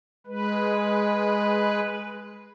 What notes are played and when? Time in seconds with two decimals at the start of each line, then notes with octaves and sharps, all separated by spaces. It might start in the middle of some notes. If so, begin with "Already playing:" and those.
0.27 G#3 B4